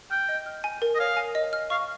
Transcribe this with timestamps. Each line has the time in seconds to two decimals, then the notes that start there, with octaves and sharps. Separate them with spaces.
0.11 G5 F6
0.29 D#5
0.46 F6
0.64 G#5
0.82 A#4
0.95 D#5
0.99 C#5 F5
1.17 G#5
1.35 D#5
1.53 F6
1.70 F5 C#6